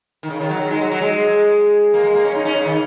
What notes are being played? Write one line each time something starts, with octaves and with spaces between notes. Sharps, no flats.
D#3
C#3
D#3
F#3
D#3
G#3
F#3
F#3
G#3
A#3
G#3
A#3
C#4
D#4
C#4
C#3
D#3